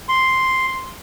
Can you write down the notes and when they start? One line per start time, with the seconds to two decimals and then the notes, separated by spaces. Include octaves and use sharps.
0.09 C6